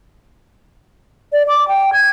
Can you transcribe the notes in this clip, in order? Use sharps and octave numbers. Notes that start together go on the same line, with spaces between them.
D5
D6
G5
G#6